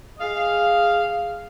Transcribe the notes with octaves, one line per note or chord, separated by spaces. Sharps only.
G#4 D#5 F5